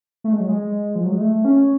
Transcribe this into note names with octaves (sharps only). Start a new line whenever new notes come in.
A3
G#3
F#3
G#3
F3
F#3
G#3
A3
C#4